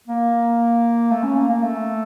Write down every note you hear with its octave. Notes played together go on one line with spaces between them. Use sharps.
A#3
A3
C#4
A#3
A#3
A3